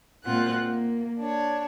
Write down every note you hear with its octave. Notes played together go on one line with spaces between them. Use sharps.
A#2 G#3 C4 F4 F#5 F#6
A#3
D4 C#5